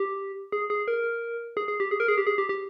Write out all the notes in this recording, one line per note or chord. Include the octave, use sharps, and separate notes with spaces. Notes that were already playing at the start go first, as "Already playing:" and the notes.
Already playing: G4
G#4
G#4
A#4
G#4
G#4
G4
G#4
A#4
G#4
G4
G#4
G4
G4